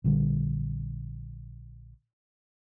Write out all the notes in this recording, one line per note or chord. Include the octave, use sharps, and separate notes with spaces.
A#1 D3 G3